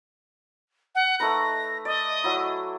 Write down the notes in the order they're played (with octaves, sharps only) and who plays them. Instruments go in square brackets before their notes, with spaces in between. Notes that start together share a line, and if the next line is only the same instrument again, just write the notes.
[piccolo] F#5
[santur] A3 D#4 B4 [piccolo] A#6
[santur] D5 [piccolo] D#5
[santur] F#3 E4